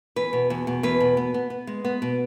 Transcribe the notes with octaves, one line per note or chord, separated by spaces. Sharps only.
E2 B4
B2
E2
B2
E2 B4
B2
B3
B3
B3
G#3
B3
B2